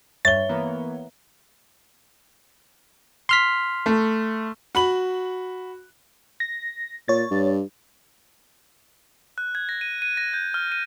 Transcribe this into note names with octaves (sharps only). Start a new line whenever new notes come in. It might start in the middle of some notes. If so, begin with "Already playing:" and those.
G2 C#5 E5 A6 G7
E3 A#3 B3 A#5
C6 F6 B6
A3
F#4 B5 F#7
A#6
A#2 C#5 A6
G2
F#6
G#6
A#6
D#7
D#7
A#6
G6
F6
D#7